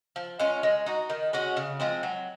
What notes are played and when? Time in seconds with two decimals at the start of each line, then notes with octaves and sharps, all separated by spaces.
0.16 F3
0.39 G#3 C#4 F4
0.63 G#3
0.86 D#4 F#4
1.10 D#3
1.33 G#3 C#4 F#4
1.57 C#3
1.80 F3 G#3 C4
2.03 F#3